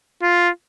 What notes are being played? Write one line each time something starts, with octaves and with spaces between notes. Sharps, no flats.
F4